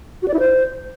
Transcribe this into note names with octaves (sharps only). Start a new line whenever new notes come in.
F#4
D5
E4
C5